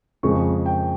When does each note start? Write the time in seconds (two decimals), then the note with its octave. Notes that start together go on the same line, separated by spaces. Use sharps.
0.23 F2 C#3 F3 G#3 C#6
0.66 G5